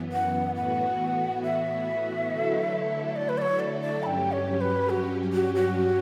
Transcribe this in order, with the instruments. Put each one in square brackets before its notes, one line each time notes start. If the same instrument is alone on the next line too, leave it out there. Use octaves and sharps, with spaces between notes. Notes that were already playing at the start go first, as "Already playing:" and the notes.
Already playing: [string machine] F#2 E3 B3
[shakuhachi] F#5
[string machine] A2 E3 B3 F#4 [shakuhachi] F#5
[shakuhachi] E5
[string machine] D3 F#3 A3 E4 A4
[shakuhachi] D5
B4
D5
C#5
D5
D5
[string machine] G2 F#3 C#4 G4 [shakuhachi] G5 B5
[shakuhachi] C#5
B4
F#4
F#4
F#4